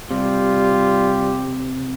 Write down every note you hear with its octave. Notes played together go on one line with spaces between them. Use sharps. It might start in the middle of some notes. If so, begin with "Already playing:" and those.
C3 G3 F4 G4